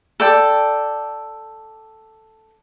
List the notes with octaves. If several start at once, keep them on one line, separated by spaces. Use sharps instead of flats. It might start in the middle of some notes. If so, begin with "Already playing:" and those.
A4 D5 G5